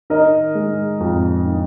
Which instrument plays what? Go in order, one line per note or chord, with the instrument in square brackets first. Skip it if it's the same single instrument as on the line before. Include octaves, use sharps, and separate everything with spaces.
[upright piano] D#3 A#4 D#5
G#3
F2
D#3